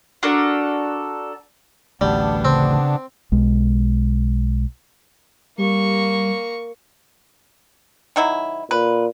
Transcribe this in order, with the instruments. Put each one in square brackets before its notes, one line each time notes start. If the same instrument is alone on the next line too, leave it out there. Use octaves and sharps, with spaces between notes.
[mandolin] D4 F#4 A4 A#4
[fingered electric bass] A1 D2 [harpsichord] G3 [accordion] B3 D4
[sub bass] C#3 [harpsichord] C4
[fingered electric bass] B1 G#3
[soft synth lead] G3 [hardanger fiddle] A#3 C#6
[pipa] D#3 F#3 E4
[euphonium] A#2 [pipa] B4